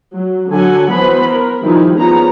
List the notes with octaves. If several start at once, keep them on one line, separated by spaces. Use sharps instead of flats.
F#3
D3 F#3 A4 F#5 G#5
E3 B3 B4 C5 B5
A#4
D#3 F3 G3 D#4 E4
F3 B3 C#4 G#4 A#5